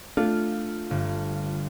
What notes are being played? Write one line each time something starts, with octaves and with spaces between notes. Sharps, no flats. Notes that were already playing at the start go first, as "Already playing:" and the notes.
A3 D4 F4
G1